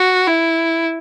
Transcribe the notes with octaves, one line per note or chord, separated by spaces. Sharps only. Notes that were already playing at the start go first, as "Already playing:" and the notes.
Already playing: F#4
E4